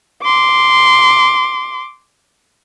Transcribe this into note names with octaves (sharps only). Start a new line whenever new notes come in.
C6 D6